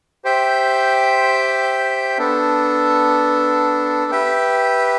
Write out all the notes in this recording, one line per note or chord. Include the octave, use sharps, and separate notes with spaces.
G4 C5 E5 G5
B3 D4 A4
G4 B4 E5 G5